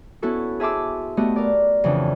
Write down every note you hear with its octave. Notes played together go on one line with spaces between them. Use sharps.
B3 C#4 E4 F#4 A4
G#4 E5 A5 C6 D6 E6
A3 B3 F#4 G4 D#5
A#4 D5
F2 C#3 E3 D4